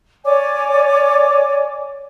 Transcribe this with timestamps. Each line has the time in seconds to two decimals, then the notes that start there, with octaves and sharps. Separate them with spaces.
0.24 C#5 D5 G#5 D6